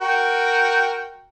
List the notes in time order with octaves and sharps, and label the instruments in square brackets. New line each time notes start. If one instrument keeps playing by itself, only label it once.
[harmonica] F#4 A#4 G5